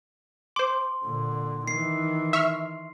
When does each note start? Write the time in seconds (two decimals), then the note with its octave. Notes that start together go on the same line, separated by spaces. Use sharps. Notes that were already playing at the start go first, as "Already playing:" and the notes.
0.56 C5 C6 D6
1.05 A#2 D3
1.68 D#3 E3 C7
2.33 E5 C#6 F6